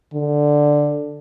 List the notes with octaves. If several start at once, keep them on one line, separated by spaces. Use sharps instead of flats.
D3